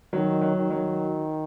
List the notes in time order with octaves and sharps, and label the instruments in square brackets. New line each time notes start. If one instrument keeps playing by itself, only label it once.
[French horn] D#3 [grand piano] F#3
[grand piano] F#3
[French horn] D#3
[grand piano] F#3